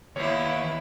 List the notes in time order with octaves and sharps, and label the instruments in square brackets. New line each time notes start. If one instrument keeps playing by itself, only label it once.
[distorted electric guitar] D#2 [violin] B3 E4 [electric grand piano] C#5